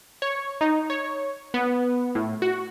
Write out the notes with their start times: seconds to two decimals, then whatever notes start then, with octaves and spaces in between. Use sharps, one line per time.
0.22 C#5
0.61 D#4
0.90 C#5
1.54 B3
2.15 A2
2.42 F#4